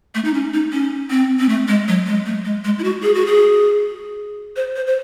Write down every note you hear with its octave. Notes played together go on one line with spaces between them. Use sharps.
A3
D#4
C#4
D#4
C#4
C4
C4
A3
G#3
F#3
G#3
A3
G#3
G#3
E4
F#4
G#4
F#4
G#4
C5
C5
C5